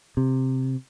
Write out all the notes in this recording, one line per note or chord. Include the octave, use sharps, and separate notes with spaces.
C3